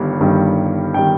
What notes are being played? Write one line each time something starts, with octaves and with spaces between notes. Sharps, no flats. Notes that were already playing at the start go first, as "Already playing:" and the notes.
Already playing: G1 G2 D#3 G3
G1 G2 D#3 G3
D#3 G3 G5